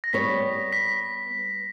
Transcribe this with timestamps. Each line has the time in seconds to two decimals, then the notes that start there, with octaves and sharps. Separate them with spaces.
0.04 A#6
0.13 G3 B3 G4 C#5 B6
0.72 B6